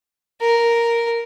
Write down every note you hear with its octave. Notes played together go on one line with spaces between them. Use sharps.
A#4